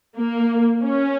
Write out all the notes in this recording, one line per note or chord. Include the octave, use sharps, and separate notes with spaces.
A#3
C#4